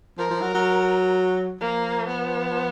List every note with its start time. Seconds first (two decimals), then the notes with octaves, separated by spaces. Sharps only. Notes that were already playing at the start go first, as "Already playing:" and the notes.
0.18 F3 A#4
0.30 F3
0.41 F#3
0.54 F#3
1.61 F3 A#3
2.07 B3